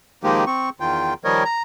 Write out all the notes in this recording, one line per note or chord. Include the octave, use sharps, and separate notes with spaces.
D#3 F3 G#3 A#3 D#4 G4
C4 C#6
E2 D#3 F4 G5
D#3 F3 G3 A#4 C#5 D#5
A#5